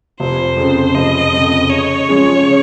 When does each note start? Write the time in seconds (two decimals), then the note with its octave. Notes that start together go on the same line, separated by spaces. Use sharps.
0.20 F1 C5
0.57 F2 C#3
0.94 F1 D#5
1.33 F2 C#3
1.70 C#3 C#5
2.09 F3 G#3 C#4 G#4
2.47 C#3